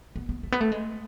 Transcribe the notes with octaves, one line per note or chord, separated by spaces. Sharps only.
B3
B3
A3
B3
A3
G#3